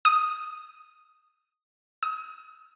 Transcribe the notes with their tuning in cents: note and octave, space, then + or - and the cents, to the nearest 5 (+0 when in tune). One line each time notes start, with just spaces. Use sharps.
D#6 -5
D#6 +30